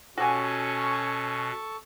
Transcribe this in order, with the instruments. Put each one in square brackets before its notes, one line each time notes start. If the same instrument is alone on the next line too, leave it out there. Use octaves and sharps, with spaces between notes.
[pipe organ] B2 [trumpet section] C#4 [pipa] F#4 G4 G#5 [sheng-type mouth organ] A4 C#6